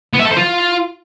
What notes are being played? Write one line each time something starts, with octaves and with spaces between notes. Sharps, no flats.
B3
E5
A4
C5
F4